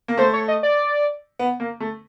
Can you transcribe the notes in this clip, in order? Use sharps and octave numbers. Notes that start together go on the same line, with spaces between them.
A#3
A3 C5
C#5
D#5
D5
B3
A#3
A3